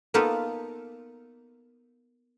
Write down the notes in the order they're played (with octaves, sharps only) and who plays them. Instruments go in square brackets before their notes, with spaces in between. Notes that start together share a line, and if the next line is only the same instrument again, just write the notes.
[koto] A#3 B3 D#4 F4 A4 B4